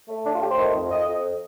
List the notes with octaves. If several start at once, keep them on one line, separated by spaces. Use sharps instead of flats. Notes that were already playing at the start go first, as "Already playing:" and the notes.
A3
A2 D4
F4
A3 G4
C5
D#3
F2
F2 D#5
F2